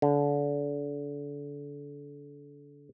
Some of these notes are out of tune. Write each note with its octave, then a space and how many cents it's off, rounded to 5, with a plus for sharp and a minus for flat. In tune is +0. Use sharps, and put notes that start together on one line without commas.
D3 -30